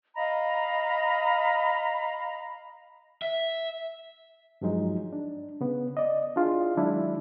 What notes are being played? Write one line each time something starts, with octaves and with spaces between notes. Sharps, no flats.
D#5 F5 A#5 B5
E5
G2 F3 F#3 G#3 D#4
D4
C#3 B3
D5 D#5
D4 E4 F4 G#4
D#3 F#3 G#3 D4 E4